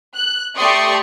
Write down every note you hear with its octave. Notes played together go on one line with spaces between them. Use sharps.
F#6
A3 G4 D5 C6 C#6 D#6